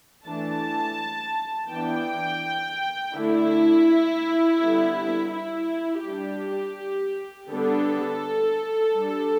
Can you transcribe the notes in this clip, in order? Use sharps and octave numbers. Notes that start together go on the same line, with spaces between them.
E3 A3 D4 A5
E3 B3 D4 G5
D3 A3 D4 E4
D3 G3 B3
E4
G3 D4 G4
D3 G3 B3 D4 A4
G3 D4